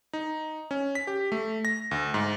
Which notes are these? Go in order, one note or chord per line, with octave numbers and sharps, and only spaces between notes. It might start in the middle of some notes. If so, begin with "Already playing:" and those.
D#4
C#4
B6
G4
A3
A#6
D2
G#2